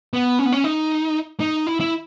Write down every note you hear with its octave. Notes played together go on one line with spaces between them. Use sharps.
B3
C#4
B3
C#4
D#4
D#4
E4
E4